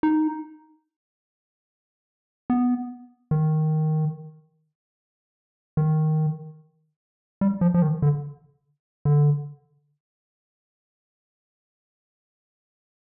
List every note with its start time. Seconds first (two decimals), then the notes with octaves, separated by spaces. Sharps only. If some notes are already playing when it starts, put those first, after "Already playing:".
0.03 D#4
2.50 B3
3.31 D#3
5.77 D#3
7.41 G3
7.61 F3
7.74 F3
7.82 D#3
8.02 D3
9.05 D3